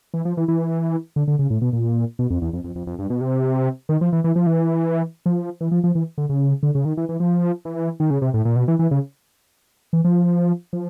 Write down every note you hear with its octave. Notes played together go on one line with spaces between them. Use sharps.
E3
F3
E3
E3
D3
D3
C#3
A2
B2
A#2
B2
F2
E2
F2
F2
F2
F2
G2
B2
C3
D#3
F3
E3
E3
F3
E3
F3
E3
F3
F3
E3
D3
C#3
D3
C#3
D#3
E3
E3
F3
E3
D#3
C#3
C3
A2
A#2
B2
E3
E3
C#3
E3
F3
F3